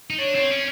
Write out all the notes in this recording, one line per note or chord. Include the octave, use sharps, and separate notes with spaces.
D#4
D4 C#5
C4
C#4